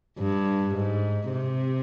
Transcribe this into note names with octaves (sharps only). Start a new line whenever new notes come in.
G2
G#2
C3